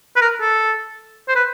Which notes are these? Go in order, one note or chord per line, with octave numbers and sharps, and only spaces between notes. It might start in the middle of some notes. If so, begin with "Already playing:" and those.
B4
A#4
A4
C5
B4